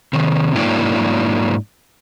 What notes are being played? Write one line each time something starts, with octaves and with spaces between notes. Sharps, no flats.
C3 D#3
G#2 F#3 A#3 D4 E4 G5